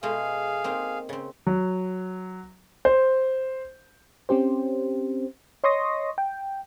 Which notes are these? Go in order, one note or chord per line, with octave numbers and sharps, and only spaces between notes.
B2 G#3 A3 G#4 F5
A#3 C4 D#4
C#3 C4
F#3
C5
C4 C#4 G4 C5
C#5 D#5 C6 C#6 D#6 A#6
G5